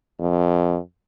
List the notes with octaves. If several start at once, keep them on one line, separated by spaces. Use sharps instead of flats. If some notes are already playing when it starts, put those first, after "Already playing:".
F2